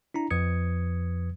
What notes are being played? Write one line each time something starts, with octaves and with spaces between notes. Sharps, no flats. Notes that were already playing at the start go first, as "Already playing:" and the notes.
D4 E4 A#5
F2 F3 B4 D#6 G#6 C#7